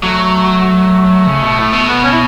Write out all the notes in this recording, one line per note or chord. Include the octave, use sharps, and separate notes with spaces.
F#3 A3
C#3
B2
A2
B2
B3
C#4
E4